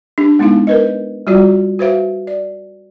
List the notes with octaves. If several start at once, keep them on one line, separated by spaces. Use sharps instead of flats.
D4 G4
G#3 B3 D#4 E4 F5
A#4 B4 D#5
G3 F4 F#4 D5
F#4 B4 C5 E5 F5
D5